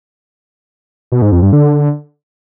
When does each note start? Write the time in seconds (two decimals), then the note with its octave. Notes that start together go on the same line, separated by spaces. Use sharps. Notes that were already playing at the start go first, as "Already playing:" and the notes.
1.12 B2
1.22 G#2
1.32 F2
1.42 G2
1.53 D3